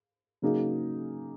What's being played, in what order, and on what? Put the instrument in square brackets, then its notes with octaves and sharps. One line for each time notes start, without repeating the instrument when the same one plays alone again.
[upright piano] C#3 F#3 A#3 D#4 G#4